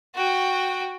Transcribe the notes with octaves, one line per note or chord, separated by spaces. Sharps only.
F#4 G5